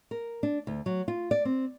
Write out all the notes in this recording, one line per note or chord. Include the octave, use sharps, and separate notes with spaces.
A#4
D4
D2
F#3
F4
D5
C4